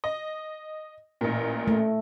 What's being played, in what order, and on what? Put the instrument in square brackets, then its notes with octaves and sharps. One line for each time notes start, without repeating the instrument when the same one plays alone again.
[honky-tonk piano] D#5
A1 A#2
[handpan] A3